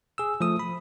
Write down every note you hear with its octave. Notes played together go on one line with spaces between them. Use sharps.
G#4 E6
F3 A3 D#6
B5